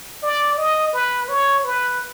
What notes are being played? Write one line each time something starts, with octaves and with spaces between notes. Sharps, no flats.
D5
D#5
B4
C#5
B4